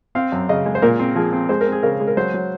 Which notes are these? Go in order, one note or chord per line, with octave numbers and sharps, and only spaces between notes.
C4 F5
F#2
C#3 D#5
G#3
C5
A#2 A#4
C4
F3 G#4
C4
G#3 C5
A#4
C4
G#4
C#3 A#4
G#3
A#4
F#3 C5
F#3